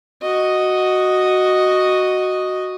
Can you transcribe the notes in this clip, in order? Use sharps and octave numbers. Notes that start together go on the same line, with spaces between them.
F#4 D#5